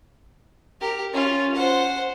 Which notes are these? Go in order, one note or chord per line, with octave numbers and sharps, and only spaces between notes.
G4 A#4
C#4 F4
C5 F#5